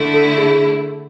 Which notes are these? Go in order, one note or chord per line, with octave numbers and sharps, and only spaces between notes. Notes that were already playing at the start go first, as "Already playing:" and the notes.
Already playing: D3 A3 E4
A4
G#4